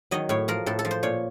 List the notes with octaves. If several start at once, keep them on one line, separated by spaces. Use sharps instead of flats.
D#3 F#3 D#5
A2 C#5
F3 A#4
A2 A4
A4
F3
C5
A#2 C#5